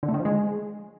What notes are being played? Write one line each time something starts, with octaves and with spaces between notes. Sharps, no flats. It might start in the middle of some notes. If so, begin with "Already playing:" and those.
D3
A3
D#3
F3
G#3